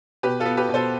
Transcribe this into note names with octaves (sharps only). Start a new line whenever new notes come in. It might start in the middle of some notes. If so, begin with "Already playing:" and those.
B2 G4 B4
F4 A4
B3
G4 B4
B2
A4 C5